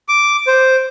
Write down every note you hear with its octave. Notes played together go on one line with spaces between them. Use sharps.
D6
C5